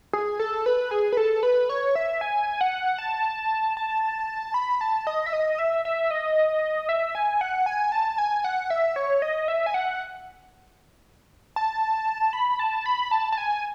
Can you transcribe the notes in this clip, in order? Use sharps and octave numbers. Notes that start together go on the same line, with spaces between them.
G#4
A4
B4
G#4
B4
A4
B4
C#5
E5
G#5
F#5
A5
A5
B5
A5
D#5
E5
D#5
E5
E5
D#5
E5
G#5
F#5
G#5
A5
G#5
F#5
E5
C#5
D#5
E5
G#5
F#5
A5
B5
A5
B5
A5
A5
G#5